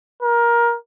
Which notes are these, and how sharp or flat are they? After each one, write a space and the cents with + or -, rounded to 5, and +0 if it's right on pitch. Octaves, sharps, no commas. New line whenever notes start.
A#4 +20